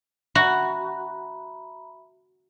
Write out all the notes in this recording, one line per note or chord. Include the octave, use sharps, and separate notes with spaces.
F#4 E5 A#5 B5